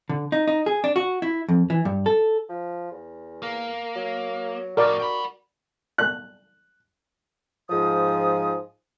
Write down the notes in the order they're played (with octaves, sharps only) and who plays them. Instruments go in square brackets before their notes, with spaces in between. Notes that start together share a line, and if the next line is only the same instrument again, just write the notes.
[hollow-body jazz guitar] D3
D#4
D#4
G#4
D4
F#4
E4
F2
E3
G2
A4
[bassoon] F3
E2
[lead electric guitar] A#3
[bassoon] F#3
[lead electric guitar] F2 A2 [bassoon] F#4 [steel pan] A#4 D5
[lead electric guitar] G5 B5
[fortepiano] F#6
[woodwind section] G#2 F3 D#6